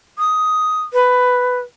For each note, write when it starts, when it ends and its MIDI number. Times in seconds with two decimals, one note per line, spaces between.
0.19 0.81 87
0.93 1.59 71